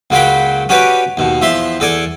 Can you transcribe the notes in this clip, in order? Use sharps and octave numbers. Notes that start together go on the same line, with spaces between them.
C#2 F#3 A#3 F#5 G5 B5
C#4 F#4 G4 B4 D5
D#2 B2
E2 F3 E5 C6
E2 A4 D5 G#5